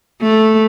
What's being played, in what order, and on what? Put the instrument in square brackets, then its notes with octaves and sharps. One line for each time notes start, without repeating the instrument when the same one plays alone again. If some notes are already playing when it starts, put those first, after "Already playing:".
[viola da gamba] A3